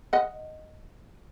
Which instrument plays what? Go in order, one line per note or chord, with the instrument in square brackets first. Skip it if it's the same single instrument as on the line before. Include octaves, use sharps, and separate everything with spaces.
[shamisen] D#5 F#5